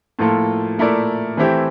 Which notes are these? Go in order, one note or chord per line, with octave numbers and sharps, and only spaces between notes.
A2 F3 A#3 F4 A4
A#2 A3 E4 A#4 D5
E3 A3 C4 E4 G4